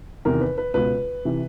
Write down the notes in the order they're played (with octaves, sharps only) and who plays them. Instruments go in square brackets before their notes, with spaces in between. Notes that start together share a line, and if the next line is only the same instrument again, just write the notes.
[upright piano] E2 C3 D#3 A#4
B4
B4
C#2 B2 B4
C3 E3